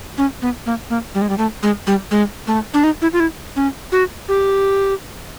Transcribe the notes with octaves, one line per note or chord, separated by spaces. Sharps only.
C#4
B3
A#3
A#3
G3
G#3
G3
A3
G#3
G3
G#3
A3
D4
D#4
E4
F4
E4
C#4
F#4
G4